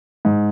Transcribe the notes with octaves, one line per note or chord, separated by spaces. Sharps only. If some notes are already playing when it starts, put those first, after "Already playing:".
G#2